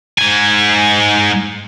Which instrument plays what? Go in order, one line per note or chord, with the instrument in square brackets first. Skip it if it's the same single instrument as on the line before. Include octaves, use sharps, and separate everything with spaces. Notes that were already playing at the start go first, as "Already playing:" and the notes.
[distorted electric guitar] G#2 G#5